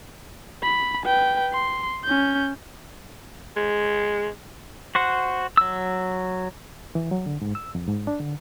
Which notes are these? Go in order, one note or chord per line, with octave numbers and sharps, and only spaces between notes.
B5
B4 G5
C6
C#4 G6
G#3
F#4 C5 F#5
F#3 E6
E3
F#3
D3
G#2
E6
F2
G#2
D4
D3